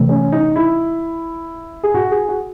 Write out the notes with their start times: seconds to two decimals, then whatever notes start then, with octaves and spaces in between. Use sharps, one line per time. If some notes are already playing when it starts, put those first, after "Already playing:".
Already playing: C3 E3 A3
0.09 C#4
0.32 D#4
0.56 E4
1.83 G#4
1.94 F#4
2.11 G#4
2.28 F#4